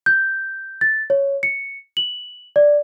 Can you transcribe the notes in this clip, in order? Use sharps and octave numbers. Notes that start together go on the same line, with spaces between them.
G6
A6
C#5
C#7
F#7
D5